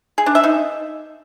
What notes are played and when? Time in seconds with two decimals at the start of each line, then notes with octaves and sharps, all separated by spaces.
0.18 G#4
0.26 D4
0.35 E5
0.44 D#4